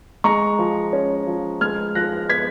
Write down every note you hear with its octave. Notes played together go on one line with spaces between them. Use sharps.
G#3 A#5 C#6
F3
C#4
F3
G#3 F6 G#6
F3 F#6 A#6
B3 G#6 B6